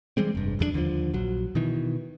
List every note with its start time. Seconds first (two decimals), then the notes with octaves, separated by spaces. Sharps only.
0.17 E3 G3 G#3 C4
0.35 F1 G2
0.59 E1 F2 F#3 D4
0.74 D#2 D3 D#3 F3
1.14 A#1 F#3
1.55 B2 D#3 E3